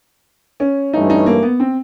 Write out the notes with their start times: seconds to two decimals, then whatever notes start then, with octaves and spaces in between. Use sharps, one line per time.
0.60 C#4
0.93 G2 E3 A3 C#4 D#4
1.10 D#4
1.26 A#3
1.43 B3
1.60 C4